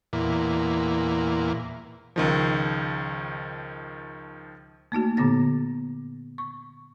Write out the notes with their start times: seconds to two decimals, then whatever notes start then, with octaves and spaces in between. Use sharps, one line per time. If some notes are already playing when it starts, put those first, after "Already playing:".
0.13 E2 A#2
2.16 C#2 D#3 F3
4.92 A3 A#3 D#4 F#4
5.17 A#2 D3 B3 A6
6.38 C#6